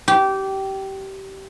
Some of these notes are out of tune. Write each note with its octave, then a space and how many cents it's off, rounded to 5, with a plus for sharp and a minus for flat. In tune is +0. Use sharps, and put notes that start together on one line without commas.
G4 -20